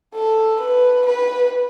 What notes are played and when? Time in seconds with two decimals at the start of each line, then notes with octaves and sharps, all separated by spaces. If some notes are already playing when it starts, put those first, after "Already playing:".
0.15 A4
0.61 B4
1.06 B4